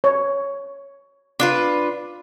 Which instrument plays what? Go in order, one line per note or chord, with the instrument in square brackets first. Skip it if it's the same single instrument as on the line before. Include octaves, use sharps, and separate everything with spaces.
[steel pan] C#5
[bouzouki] D4 F4 B4